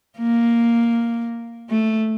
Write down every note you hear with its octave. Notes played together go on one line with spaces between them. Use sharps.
A#3
A3